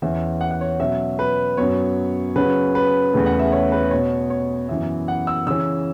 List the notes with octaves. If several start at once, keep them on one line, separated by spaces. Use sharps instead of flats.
E2 E3 C#4 E5
F#5
F#5
C#5
B2 F#3 C#4 E5
B4
F#2 F#3 B3 C#5
C#3 F#3 C#4 B4
B4
E2 C#3 A3
F#5
E5
C#5
B4
B2 B3 C#5
C#5
F#2 E3 B3 E5
F#5
E6
C#3 E3 C#4 E6